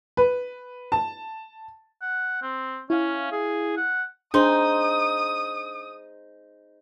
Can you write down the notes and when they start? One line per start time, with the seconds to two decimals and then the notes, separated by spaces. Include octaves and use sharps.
0.17 B4
0.92 A5
2.02 F#5
2.42 C4
2.90 C#4 E4 F5
3.32 G#4
3.77 F#5
4.34 D4 D#4 G#4 C5 C6 D#6